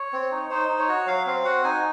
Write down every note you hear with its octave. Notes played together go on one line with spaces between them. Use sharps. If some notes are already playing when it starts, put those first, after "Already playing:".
Already playing: C#5
C4
D#4
D#4 C5
D#4
C#5
F#4
F#3 F5
C4 F5
F#4 F#5
D#4 G#5